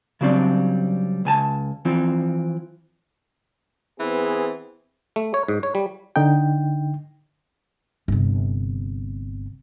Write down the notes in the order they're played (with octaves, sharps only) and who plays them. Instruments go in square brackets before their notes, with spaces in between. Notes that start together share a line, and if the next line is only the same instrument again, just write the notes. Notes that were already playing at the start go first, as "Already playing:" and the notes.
[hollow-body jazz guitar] C#3 F#3 G3 C4 D4
C#2 G#5 A5
E3 F3 C4
[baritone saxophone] E3 [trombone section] B3 C4 G#4
[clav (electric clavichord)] A3
C#5
G#2
C#5
G3
[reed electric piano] D3 D#4 G5
[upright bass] G1 C3